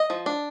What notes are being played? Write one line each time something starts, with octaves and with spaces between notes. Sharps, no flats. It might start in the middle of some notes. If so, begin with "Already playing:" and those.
Already playing: D#5
F3
D4